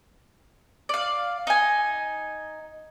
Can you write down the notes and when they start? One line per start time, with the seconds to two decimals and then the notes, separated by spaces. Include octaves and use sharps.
0.89 D5 F5
1.47 D#4 G#5